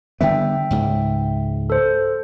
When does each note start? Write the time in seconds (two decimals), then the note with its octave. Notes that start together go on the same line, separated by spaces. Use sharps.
0.21 D3 G3 B3 E5 G5
0.71 C#2 G#2
1.70 A4 C5